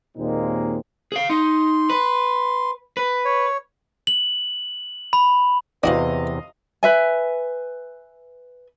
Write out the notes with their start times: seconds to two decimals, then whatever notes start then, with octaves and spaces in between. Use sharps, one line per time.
0.16 D#2 A#2 G#3 A#3 C4 D#4
1.12 G#4 F5
1.30 D#4 C6
1.90 B4
2.97 B4
3.25 C#5
4.07 F#7
5.13 B5
5.83 E2 C3 D4 E4 F#4 B4 D#5 F5
6.83 B4 E5 G#5